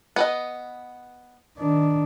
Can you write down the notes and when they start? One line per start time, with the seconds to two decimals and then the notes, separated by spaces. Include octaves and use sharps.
0.16 B3 B4 D#5
1.57 D#3 D4